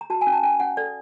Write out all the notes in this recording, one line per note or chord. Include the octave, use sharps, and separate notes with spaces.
A#5
F#4 A5
G#5
C#4
A5
C#4 G#5
C#4 F#5
A4 D5